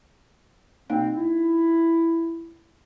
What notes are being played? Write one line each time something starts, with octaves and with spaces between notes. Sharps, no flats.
B2 A#3 C4 D#4
E4